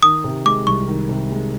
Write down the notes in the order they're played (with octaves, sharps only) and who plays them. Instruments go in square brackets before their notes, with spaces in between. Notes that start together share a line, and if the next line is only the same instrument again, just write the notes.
[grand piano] D#3 [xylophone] D#6
[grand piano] C3
[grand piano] G#3 [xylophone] D6
[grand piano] C2 [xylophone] C#6
[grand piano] D#3
C3
G#3